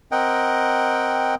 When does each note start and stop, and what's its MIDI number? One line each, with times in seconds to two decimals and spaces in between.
0.12 1.35 60
0.12 1.35 70
0.12 1.35 75
0.12 1.35 78
0.12 1.35 79